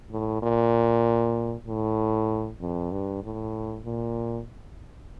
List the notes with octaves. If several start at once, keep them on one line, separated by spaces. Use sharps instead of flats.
A2
A#2
A2
F2
G2
A2
A#2